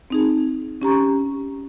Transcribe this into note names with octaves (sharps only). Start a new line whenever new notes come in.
C4 D#4 G#4
C#4 G4 A#5 C#6